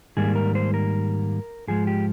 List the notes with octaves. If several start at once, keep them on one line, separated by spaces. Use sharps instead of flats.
G#2 D#3 G3 A#3 G#4
A#4
C5
A#4
G#2 F3 G#3 G#4
G4